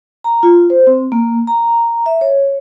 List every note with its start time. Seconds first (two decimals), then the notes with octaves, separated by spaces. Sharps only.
0.24 A#5
0.43 F4
0.70 C5
0.87 C4
1.12 A#3
1.47 A#5
2.06 E5
2.21 C#5